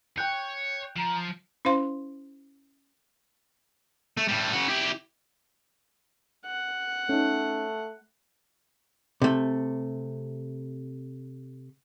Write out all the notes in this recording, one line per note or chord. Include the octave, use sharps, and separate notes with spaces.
C#5 G5 F#6 G6
F3 A#5
C#4 E4 C5 F5 C6
A3
A2 G3
C#3 F#4
E4 G4
F#5
A3 C#4 D#4
C3 A3